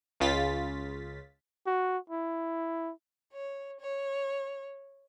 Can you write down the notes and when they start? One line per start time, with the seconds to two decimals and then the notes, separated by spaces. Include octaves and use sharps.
0.20 C#2 C#3 F4 A6 B6
1.67 F#4
2.10 E4
3.33 C#5
3.80 C#5